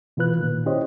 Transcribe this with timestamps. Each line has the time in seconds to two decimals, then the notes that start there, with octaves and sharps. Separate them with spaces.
0.17 B2 E3 F4 B4 F#6
0.40 A#2 D#3
0.66 C#4 E4 G4 C5 C#5 D#5